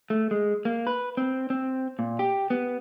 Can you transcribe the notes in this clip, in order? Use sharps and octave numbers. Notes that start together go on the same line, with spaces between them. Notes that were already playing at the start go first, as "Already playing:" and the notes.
A3
G#3
A#3
B4
C4
C4
A#2
G4
B3